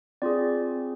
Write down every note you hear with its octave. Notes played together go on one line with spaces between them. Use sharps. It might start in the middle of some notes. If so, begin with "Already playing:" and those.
C4 F4 G#4 D5